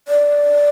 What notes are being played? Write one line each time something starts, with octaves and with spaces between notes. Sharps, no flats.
D5